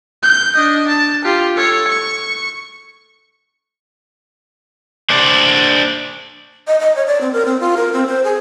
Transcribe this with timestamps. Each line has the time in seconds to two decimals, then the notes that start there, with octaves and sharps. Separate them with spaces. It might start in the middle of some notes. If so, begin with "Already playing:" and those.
0.23 G6
0.56 D4 D#5
0.89 A5
1.25 F4 G4
1.56 A4 C#5
1.88 C#6
5.10 D4 C5 D5
6.67 D#5
6.80 D#5
6.96 C#5
7.07 D5
7.21 C4
7.33 A#4
7.45 C4
7.60 F4
7.77 A#4
7.93 C4
8.07 C5
8.24 G#4